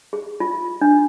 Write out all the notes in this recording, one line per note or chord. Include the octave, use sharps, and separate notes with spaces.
G#4
F4
D4